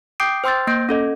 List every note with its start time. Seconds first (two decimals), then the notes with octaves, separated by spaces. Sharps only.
0.20 G5 D6 D#6 G6 C7 D7
0.44 C5 G5 C6 E6 G6 A6
0.67 A#3 G6 A#6 D7
0.89 C#4 A4 D#5